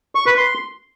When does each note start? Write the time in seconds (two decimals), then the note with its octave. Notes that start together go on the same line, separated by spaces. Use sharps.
0.15 C#6
0.26 B4
0.37 C6